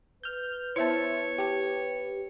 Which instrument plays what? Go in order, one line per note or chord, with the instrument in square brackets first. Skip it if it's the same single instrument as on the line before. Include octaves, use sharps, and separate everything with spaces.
[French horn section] B4 [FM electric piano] F6 G6
[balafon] B3 E4 [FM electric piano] C5 E5 A5 [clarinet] C#5
[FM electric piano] G4 [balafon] G5 A5